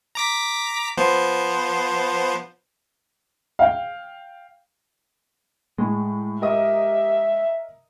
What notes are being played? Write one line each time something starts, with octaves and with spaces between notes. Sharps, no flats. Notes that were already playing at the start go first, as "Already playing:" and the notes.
A#5 D6 B6
F3 B3 C5
F5 G5
A2 G#3
G4 A#4 D#5 E5 D#6